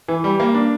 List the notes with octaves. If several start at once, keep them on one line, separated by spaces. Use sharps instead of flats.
E3
G3
A#3
D4